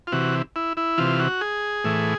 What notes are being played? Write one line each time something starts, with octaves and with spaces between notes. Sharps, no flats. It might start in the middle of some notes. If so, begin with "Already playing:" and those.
F4
C3 E3 F#4
E4
E4
C3 E3 F4
F#4
G#4
A2 E3